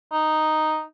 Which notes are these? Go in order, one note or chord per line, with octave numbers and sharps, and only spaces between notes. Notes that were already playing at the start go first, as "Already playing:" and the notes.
D#4